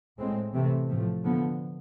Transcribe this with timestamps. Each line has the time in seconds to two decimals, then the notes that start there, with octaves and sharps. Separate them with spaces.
0.19 A2 G#3 C4
0.54 C3 E3 A3 C4
0.89 A2 F3 A3
1.23 D3 F3 B3